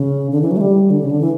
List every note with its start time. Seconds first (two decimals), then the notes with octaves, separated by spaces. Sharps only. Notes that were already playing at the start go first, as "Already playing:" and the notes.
Already playing: C#3
0.32 D3
0.41 E3
0.51 F#3
0.57 A3
0.61 G3
0.90 D3
1.01 C#3
1.11 D3
1.21 E3